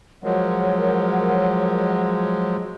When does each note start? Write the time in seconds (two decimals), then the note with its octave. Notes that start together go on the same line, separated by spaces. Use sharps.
0.24 F3 F#3 G#3 A#4 C#5 F#5